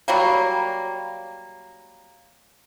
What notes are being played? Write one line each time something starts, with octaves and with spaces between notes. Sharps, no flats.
F#3 G3 A#3